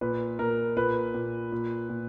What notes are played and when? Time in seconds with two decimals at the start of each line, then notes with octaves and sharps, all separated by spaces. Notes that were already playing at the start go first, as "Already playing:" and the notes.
0.01 A#2 B4
0.39 A#2 A#4
0.76 A#2 B4
1.14 A#2
1.52 A#2
1.89 A#2